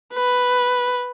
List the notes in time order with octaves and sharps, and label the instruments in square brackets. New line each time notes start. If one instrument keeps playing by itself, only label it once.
[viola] B4